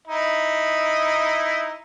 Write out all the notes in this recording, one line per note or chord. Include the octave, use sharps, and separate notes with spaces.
D#4 E4